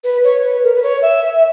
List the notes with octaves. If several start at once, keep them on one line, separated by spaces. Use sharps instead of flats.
B4
C#5
B4
A#4
B4
C#5
E5